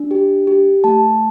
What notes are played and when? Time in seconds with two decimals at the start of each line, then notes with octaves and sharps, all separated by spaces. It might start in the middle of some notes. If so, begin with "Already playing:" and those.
Already playing: D4
0.11 G4
0.47 G4
0.84 A3 A5